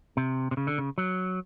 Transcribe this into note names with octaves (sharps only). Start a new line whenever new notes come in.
C3
C3
C#3
D3
C#3
F#3